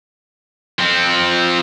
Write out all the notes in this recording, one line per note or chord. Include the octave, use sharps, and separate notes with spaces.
F3 C4